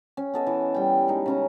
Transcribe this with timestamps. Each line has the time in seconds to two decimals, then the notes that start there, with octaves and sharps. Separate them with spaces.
0.17 C#4
0.34 B3 A4 D#5
0.47 E3
0.74 G3 G5
1.08 G#3 D#4
1.26 C#3 C#4 A#5